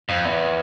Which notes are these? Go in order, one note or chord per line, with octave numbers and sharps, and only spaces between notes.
F2
E2